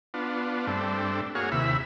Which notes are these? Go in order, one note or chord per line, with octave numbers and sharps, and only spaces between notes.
B3 D4 F4
G2 A3 C4 D4
A#3 F#4 G#4 C#5 F5
D#2 C3 E4 E5 B5